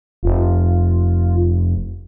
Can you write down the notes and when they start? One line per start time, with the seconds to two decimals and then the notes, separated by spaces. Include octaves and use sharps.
0.23 F1 F4